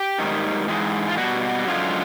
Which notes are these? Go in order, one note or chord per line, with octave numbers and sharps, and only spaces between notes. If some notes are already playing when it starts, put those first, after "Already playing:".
Already playing: G4
G#2 D#3 G3
G#2 E3 G#3
F4
B2 G3 F#4
F#2 D3 F3 G#3 F4